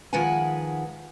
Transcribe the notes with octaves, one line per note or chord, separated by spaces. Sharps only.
D#3 F3 G#3 B4 F#5 G#5